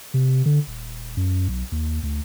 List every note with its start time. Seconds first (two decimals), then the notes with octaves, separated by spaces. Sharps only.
0.14 C3
0.46 D3
0.67 D#1
1.17 F#2
1.48 B1
1.72 D#2
2.03 D2